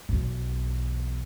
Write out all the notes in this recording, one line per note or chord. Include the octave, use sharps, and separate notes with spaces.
B1 E2